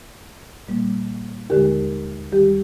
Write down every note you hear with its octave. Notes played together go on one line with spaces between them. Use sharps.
A#2 G3 A#3
D#2 D3 G#3 G4 A#4
D#2 D#3 G3 G4